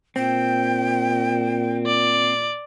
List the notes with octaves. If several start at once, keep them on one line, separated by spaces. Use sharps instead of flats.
A#2 C4 G5
D5